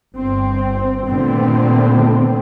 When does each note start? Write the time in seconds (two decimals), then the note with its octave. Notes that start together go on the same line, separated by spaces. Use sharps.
0.14 G1 C4
1.07 A#2 D3 D#3 A3 B3 C4